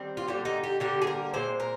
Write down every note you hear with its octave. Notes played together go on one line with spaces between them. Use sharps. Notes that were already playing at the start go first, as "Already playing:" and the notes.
Already playing: D#3 G3 C4
F4
D3 G3 A#3 G4
D#4
G4
D3 G3 A#3 G4
G#4
A#4
A#2 G#3 C4 C5
A#4